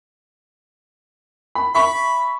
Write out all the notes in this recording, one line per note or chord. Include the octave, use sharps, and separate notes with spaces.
B5
E5 B5 C#6